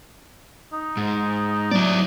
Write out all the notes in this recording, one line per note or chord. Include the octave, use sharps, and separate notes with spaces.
D#4
G#2
F#3 E4 D5